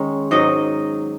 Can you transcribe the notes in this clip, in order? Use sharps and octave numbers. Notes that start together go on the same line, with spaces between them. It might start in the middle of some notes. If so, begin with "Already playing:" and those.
Already playing: D#3 G#3 C#4
G#2 F#3 D#4 D#5